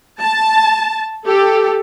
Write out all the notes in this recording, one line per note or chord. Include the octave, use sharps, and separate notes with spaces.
A5
G4 A4